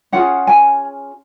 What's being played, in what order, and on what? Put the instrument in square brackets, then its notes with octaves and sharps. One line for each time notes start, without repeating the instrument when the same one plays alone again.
[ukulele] C#4 F4 G#4 F#5
G#5